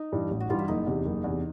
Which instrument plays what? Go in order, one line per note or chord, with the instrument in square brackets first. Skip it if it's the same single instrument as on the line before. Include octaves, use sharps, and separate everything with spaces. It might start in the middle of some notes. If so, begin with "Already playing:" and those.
Already playing: [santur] D#4
[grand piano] G2 E3 G3
A1
[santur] F#4
[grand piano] G2 E3 G3 [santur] F4
[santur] E4
[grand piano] F#1 [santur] D#4
[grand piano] E2 C3
F#1
E2 C3